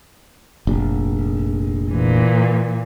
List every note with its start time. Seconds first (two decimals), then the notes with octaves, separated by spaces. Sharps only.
0.67 F1 A#1
1.92 A#2 E3